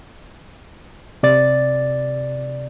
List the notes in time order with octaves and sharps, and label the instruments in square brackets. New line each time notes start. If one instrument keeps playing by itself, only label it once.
[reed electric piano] C3 D5 A6